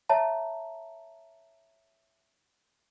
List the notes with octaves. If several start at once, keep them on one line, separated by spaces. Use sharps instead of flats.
C#5 E5 A5 A#5